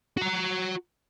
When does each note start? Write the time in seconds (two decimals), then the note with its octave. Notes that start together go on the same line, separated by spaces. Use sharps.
0.18 F#4 A#5